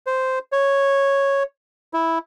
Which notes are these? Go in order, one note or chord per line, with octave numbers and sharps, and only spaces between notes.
C5
C#5
E4